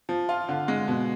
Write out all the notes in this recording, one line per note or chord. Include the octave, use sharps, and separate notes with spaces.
F3
F4
D3
G#3
B2